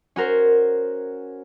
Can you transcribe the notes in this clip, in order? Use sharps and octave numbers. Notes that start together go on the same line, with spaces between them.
C#4 F#4 A#4 C5